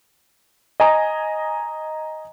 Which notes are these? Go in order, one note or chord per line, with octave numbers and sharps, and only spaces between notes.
D#5 G#5 A#5 D#6